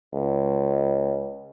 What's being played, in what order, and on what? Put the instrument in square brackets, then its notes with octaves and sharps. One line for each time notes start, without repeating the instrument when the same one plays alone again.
[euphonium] C#2